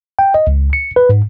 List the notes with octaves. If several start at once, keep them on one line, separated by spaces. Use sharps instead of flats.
G5
D#5
C#2
C#7
B4
G#2